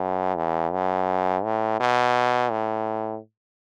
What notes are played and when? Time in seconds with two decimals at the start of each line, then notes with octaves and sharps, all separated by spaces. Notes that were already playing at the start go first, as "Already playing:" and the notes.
Already playing: F#2
0.36 E2
0.73 F#2
1.44 A2
1.80 B2
2.51 A2